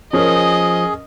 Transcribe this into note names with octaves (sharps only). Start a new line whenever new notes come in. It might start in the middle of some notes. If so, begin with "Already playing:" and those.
F3 C#4 G#4 A#4 D#5